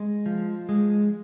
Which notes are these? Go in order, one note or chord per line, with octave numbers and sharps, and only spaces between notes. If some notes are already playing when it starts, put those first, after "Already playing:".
Already playing: G#3
F3
G#3